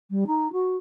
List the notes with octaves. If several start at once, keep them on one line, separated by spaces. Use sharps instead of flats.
G3
D#4
F#4